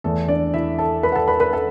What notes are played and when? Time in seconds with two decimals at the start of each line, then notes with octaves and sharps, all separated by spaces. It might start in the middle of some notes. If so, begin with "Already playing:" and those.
0.04 E2 E3 A3 A4
0.28 D4 D5
0.54 E4 E5
0.78 A4 A5
1.03 B4 B5
1.12 F#5
1.15 A4 A5
1.28 B4 B5
1.40 B4 B5
1.53 A4 A5